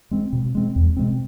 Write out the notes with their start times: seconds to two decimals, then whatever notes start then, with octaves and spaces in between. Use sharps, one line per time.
0.11 G#3 C4
0.33 B2
0.55 G#3 C4
0.76 E2
0.97 B2 G#3 C4